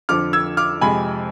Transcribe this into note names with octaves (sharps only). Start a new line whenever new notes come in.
F2 D3 F3 D6 F6
E6 G#6
D6 F6
F2 C3 G#3 G#5 B5